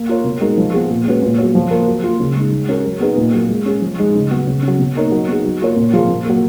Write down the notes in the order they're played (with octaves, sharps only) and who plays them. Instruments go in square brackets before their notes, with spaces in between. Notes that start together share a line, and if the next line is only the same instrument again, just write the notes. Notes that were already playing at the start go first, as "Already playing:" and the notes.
Already playing: [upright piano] A#3
F4 A#4 C#5
B2
G#3 D#4 F#4 A#4
F3
B3 F4 G#4
A#2
G#3 C#4 F#4 B4
A#2
F#3 B3 F#4 C#5
F3
A#3 F4 A#4
F#3
A#3 F4
C#3
G#3 D#4
G#3
C#4 F#4 A#4
F#3
B3 D#4 G#4 B4
A#2
F#3 A#3
G#3
C#4 G#4
F3
G#3 D#4
C#3
F#3 B3
C#3
C#4
F#3
B2
A#3 D#4 A#4 C#5
F#3
B3 D#4 G#4
F#3
A#3 F4 A#4 C#5
A#2
F3 A#3 F4 G#4
A#2
F#3 A#3